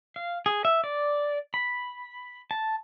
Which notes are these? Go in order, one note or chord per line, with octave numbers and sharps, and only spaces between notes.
F5
G#4
E5
D5
B5
A5